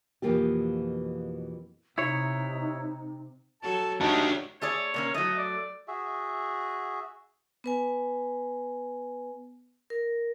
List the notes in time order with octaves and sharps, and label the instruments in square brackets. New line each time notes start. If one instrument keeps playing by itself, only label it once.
[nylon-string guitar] F2 B2 E3 A#3 F4 G4
[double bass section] C3 [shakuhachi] D#4 [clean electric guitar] E4 C#5
[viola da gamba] F#3 F#4 A4 [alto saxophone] A5
[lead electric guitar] D4 F#4 [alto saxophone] D#4 [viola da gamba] G4 C#5 [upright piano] A5
[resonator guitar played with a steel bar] A3 G#4 D5 [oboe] C#5
[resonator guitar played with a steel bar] C3 A#3 C#4
[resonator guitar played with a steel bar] F#3 A3 [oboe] D#5
[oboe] D5
[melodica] F#4 G#4 E5
[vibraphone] B3 B4 G#5
A#4